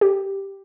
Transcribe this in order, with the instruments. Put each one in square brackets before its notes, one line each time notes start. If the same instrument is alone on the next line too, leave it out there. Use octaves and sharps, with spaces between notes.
[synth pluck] G4